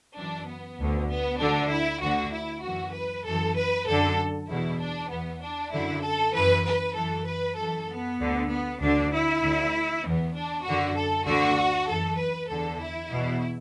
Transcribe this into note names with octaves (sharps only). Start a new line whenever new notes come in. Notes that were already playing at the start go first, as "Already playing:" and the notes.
F#2 E3 D4
B3
D2 D3
B3
D2 D3 D4
E4
D2 D3 F#4
E4
F#2 E3 F#4
B4
F#2 E3 A4
B4
F#2 D3 A4
E2 B2 E4
D4
E2 E3 B3
D4
F#2 D3 E4
A4
F#2 E3 B4
B4
F#2 E3 A4
B4
F#2 E3 A4
B3
D2 D3
B3
D2 D3 D4
E4
D2 D3
E2 E3 B3
D4
F#2 D3 F#4
A4
D2 D3 F#4
F#2 E3 A4
B4
E2 D3 A4
E4
E2 B2